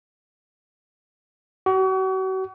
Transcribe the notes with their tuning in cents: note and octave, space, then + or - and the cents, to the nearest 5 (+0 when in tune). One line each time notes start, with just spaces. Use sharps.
F#4 +40